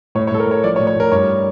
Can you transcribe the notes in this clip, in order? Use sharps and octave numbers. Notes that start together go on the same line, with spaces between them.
A2 C#5
C#5
A2 A4
A#4
A2 C#5
F3 D5
C#5
A2
C#5
A2 A#4
G2 C#5